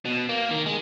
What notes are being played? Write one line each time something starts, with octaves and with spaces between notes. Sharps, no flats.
B2
A#3
D#3
G#3